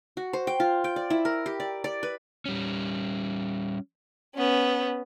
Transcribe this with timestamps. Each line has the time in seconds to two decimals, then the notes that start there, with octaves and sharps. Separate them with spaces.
0.17 F#4
0.33 C5
0.47 G5
0.60 F4
0.84 G5
0.96 D5
1.10 E4
1.25 A#4
1.46 G4
1.60 D5
1.84 D5
2.03 B4
2.46 G3 C#4
4.35 B3 C#4